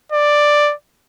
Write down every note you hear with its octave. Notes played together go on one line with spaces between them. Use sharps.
D5